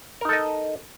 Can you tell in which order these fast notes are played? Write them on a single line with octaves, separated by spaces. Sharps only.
A#4 D#4 A4 D#5